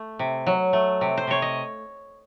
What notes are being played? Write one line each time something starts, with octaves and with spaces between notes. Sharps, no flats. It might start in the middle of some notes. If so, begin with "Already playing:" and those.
Already playing: A3
C3
F#3
A3
C3
C5
C3 C#5
D#5